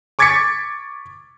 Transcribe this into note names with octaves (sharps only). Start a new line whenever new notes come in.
C#6 D6 G#6 A6 B6 C#7